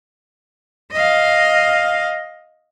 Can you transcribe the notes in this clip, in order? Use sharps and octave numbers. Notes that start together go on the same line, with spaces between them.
D#5 F5